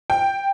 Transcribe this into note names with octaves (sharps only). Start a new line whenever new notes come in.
G5